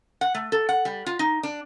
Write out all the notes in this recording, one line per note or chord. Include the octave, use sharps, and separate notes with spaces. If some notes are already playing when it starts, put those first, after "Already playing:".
F#5
A3
A4
F#5
G3
F4
D#4
D4